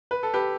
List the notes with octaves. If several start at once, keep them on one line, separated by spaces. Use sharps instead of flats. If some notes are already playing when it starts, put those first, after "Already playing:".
B4
A4
G4 B4